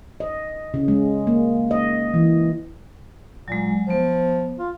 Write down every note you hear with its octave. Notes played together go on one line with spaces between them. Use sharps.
D#5
C#3
G#3
A#3
D#5
E3
A#2 F#3 G#3
F3 B3 C5
F4